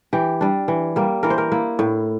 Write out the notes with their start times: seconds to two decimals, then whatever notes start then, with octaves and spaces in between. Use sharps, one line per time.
0.13 E3 G4
0.41 G3 D4
0.68 E3
0.96 G3 A#3
1.23 E3 A#4
1.30 C5
1.38 A#4
1.52 A#3 E4
1.79 A2